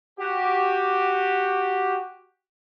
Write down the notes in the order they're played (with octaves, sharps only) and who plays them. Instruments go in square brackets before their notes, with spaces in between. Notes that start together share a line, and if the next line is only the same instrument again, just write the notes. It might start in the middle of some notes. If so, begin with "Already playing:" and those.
[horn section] F#4 G4